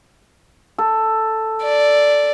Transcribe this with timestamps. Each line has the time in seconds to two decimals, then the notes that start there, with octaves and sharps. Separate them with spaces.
0.78 A4
1.63 D5